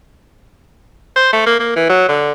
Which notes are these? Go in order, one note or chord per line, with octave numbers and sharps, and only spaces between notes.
C5
A3
A#3
A#3
E3
F#3
D3